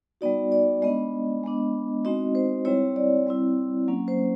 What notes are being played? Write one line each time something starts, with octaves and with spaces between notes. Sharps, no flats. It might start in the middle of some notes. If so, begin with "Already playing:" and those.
G3 B3 D#4 F#4 D5
D5
G#3 B3 D4 D#5
G#3 B3 D4
G#3 C4 D#4 F#4 D#5
C5
G3 C4 E4 C#5
D5
G3 C4 E4
F#3 A#3 C#4
C5